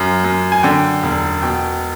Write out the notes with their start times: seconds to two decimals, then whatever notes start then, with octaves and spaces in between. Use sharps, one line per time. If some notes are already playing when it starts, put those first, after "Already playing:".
Already playing: F#2
0.24 F#2
0.52 G#5
0.63 D3 G5
1.03 E1
1.42 B2 G5